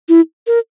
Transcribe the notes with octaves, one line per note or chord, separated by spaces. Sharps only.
E4
A#4